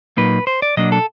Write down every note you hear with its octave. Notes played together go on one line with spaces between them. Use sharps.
A#2 F#3 A#3 D#4 B4
C5
D5
B2 F#3 A#3 D4 D#5
A4